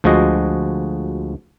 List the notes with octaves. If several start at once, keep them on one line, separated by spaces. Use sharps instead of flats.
D2 F3 G#3 F#4 D#5